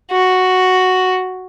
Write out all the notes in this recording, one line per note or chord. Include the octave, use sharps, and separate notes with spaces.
F#4